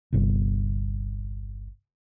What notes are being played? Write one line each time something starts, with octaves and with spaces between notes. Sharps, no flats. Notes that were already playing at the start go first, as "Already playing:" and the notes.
G1 C2